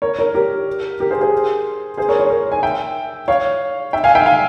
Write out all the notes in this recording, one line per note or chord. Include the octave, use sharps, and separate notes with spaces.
A#4 C#5
A#4 C#5
G4 A#4
G4 A#4
G#4 C5
G#4 C5
G#4 C5
A#4 C#5
A#4 C#5
A#4 C#5
G#5
E5 G5
C#5 F5
E5 G5
F5 G#5
E5 G5
F5 G#5